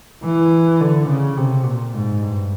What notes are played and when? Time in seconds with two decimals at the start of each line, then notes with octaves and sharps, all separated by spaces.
0.24 E3
0.80 D3
1.08 C#3
1.37 C3
1.65 A#2
1.94 G#2
2.21 G2